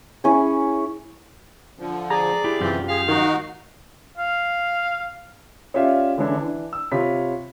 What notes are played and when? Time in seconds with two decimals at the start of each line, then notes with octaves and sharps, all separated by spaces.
0.24 C#4 E4 G#4
1.79 D3 F3
2.10 G#4 D5 A#5
2.44 E4 G4
2.60 F#2 C3 E3 C4 F4 G4
2.89 G#4 F5
3.08 D#3 D#4 F#4
4.17 F5
5.74 C#4 F4 G4 D5 E5 F5
6.18 D3 E3 G#3 C#4 D4 E4
6.37 E3 D4
6.73 E6
6.92 C3 F4 C#5 B5 B6